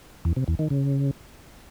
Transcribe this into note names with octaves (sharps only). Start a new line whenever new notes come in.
E2
C3
E2
D#3
C#3